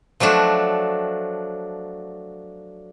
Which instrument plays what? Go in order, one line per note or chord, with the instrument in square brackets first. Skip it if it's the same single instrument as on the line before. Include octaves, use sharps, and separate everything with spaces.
[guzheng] F3 F#3 A3 D4 F#4